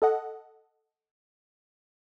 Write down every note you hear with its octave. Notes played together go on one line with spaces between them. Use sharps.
A4 D#5 F#5